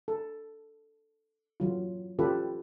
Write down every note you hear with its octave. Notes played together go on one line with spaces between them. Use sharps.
A4
E3 F#3 F4
E3 C#4 F4 G4 A4 B4